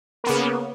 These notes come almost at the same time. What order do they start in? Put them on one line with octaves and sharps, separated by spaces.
A#3 B3 C#3